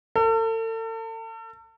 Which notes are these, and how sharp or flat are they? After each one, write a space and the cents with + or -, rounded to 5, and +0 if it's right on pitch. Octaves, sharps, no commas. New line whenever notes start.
A4 +40